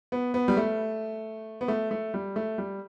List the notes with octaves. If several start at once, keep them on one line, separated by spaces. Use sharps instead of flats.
B3
B3
G3
A3
B3
A3
A3
G3
A3
G3